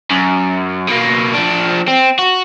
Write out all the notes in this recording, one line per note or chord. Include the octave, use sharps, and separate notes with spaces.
F#2
B2 A#3
F3 D4
C4
F#4